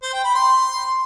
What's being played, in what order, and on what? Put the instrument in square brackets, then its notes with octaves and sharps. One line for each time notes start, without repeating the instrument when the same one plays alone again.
[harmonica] C5
G5
B5
C6